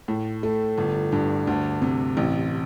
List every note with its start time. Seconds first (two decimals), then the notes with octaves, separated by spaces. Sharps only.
0.08 A2
0.43 A3
0.78 G1
1.12 G2
1.47 D2
1.82 C3
2.17 A1